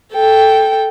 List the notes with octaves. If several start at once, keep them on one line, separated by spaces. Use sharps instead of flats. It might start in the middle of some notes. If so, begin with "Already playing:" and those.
A4 G5